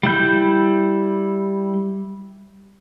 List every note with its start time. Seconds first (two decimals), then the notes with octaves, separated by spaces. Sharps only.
0.03 G3 E4 G6